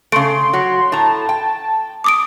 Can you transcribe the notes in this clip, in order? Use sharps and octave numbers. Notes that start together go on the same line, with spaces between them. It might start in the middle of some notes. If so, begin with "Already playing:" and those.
C#3 A3 C6 D7
F#3
A2 A5 A#5
G5
D6 D#6 D7